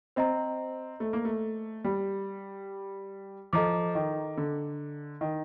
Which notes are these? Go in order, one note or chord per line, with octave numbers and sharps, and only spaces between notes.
C4 C5 D#5 A#5
A3
A#3
A3
G3
F3 A4 D#5 A#5 D6
D#3
D3
D#3